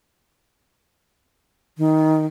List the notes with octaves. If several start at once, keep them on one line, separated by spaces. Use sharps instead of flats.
D#3